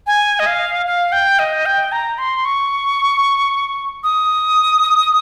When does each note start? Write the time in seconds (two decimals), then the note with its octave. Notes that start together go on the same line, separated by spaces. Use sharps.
0.07 G#5
0.39 D#5
0.46 F5
0.86 F5
1.12 G5
1.39 D#5
1.66 G5
1.92 A#5
2.18 C6
2.45 C#6
4.04 D#6